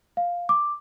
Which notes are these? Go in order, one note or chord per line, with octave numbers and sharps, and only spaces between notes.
F5
D6